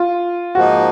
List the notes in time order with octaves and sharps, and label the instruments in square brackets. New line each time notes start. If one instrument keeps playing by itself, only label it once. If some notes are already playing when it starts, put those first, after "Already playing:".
Already playing: [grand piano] F4
[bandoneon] G#2 F3 A#3 D#4 [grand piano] F#4